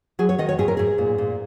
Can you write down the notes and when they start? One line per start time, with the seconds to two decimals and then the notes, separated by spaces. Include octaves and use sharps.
0.19 F#3 G#4
0.29 C#5
0.38 D#3 D#5
0.49 C#5
0.59 G#2 G#4
0.68 A#4
0.77 G#2 G#4
0.98 A#2
1.18 A#2